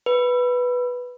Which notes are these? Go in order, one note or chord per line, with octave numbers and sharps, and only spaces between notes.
B4